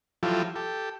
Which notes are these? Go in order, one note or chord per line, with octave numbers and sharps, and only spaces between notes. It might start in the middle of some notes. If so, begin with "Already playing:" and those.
F3 F#3 E4 F4 G4 A4
G4 A4